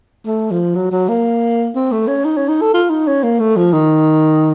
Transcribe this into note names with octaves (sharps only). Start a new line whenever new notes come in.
A3
F3
F#3
F#3
A#3
C4
A3
C#4
D#4
C#4
D#4
A4
F4
D#4
C#4
A#3
A3
F3
D#3